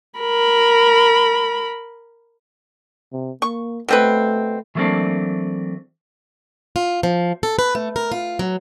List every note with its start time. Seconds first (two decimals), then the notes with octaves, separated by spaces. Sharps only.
0.20 A#4 B5
3.12 C3
3.42 A#3 C#6
3.88 B2 A3 C4 B4
4.75 E3 F#3 A3 A#3 C4 D4
6.76 F4
7.03 F3
7.43 A4
7.59 B4
7.75 A3
7.96 A#4
8.12 F4
8.39 F#3